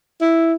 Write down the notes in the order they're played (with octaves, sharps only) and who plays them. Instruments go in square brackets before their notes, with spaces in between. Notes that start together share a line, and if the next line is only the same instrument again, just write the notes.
[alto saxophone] E4